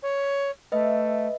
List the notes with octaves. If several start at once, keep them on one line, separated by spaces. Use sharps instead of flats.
C#5
A3 B4 D#5 E5